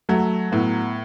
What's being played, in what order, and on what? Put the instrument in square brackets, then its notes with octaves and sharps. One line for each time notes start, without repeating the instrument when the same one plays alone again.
[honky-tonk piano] F#3 [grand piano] A3
[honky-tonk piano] A2 [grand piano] B3